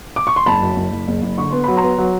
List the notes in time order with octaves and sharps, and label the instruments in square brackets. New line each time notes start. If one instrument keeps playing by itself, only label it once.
[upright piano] D6
C#6
C6
F#1 A5 B5
F#2
F#1
F#1
F#1
F#1
D3 C#6
B3 C6
F#3 B5
A#5 C6
B3
F#3